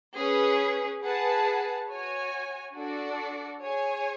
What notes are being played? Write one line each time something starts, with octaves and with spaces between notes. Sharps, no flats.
C#4 G#4 B4
G#4 B4 F#5 A5
F#4 C#5 G#5
D4 F#4 A4 D5
G#4 C#5 G#5